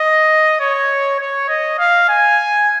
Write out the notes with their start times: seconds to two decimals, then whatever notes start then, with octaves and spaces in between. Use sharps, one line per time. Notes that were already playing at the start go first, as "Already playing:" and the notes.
Already playing: D#5
0.60 C#5
1.20 C#5
1.49 D#5
1.79 F5
2.09 G#5